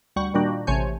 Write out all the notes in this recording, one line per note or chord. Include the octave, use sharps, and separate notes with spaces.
D2 G3 F#5 C#6
A#2 D#3 G3 A#3 D4 F#4
A1 C3 A3 C#5 G#5 G6